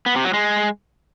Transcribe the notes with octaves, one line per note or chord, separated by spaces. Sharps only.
B3
C3
F#3
G#3